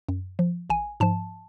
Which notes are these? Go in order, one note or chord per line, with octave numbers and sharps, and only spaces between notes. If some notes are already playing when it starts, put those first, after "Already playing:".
F#2
F3
A1 G#5
G#2 F3 A5